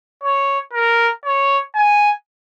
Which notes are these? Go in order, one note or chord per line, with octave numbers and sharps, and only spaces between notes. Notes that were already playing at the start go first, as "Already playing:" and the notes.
C#5
A#4
C#5
G#5